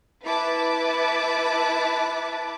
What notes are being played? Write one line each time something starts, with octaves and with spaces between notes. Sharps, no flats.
E4 B4 A5 D6